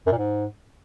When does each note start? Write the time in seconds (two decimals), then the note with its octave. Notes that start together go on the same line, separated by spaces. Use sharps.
0.07 F#2
0.12 A#2
0.18 G#2